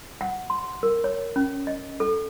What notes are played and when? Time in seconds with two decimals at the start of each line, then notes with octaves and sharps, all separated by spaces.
0.21 F#5
0.50 C6
0.83 A#4
1.04 C#5
1.36 C#4
1.67 D#5
2.00 A4